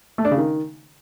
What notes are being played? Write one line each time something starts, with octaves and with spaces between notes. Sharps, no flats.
A3
D4
C#3
D#3